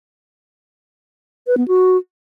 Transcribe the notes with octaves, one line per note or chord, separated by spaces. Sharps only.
B4
B3
F#4